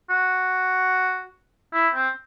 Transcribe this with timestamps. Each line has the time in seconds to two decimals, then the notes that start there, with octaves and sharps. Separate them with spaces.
0.10 F#4
1.74 E4
1.95 C4